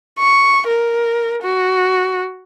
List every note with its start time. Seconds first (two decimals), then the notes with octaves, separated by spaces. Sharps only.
0.19 C#6
0.67 A#4
1.43 F#4